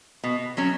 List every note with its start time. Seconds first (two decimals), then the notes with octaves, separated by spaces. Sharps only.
0.24 B2
0.57 F#3 C#4